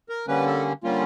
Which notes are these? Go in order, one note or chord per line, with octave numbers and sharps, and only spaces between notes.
A#4
D3 G3 A#3 C#4 B4
A4
D3 G3 A#3 C#4 F4